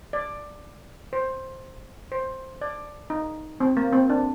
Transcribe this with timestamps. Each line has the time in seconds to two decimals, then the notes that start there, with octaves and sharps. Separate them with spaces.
0.13 D5
1.13 C5
2.12 C5
2.61 D5
3.10 D#4
3.60 C4
3.77 A#3
3.93 C4
4.10 D4